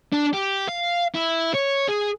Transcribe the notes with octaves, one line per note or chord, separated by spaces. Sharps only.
D4
G4
F5
E4
C#5
G#4